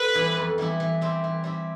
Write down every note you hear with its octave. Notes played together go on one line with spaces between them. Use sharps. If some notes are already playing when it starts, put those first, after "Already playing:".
Already playing: A4 B4
E3 G3 B3 E4
F2
E3 G3 B3 E4
E3
G3 C4 E4
E3
G3 C4 E4